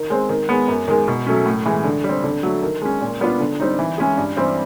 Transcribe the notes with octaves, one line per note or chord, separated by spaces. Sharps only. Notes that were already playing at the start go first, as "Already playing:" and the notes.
Already playing: D#3
G#3 C4
D#3
G#3 B3
F#2
D#3 G#3
B2
F#3 A3 C#4
A2
E3 G#3
D3
G3
C4
D3
F#3 A3
D#3
G#3 C#4
A#2
G3 B3 D4 F4
D3
G3 C4 D#4
E3
G#3 C#4 E4 G#4
G2
E3 G3 C4